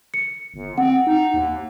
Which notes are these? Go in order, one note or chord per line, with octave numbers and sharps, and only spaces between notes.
C#7
G1
C4 F#5
D#4
D#2